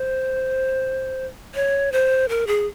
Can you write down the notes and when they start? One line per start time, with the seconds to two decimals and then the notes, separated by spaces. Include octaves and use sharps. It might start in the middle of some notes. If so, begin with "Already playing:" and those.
Already playing: C5
1.55 C#5
1.92 C5
2.29 A#4
2.47 G#4